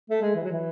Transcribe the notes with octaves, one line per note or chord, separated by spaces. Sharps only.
A3
G#3
E3
F#3
E3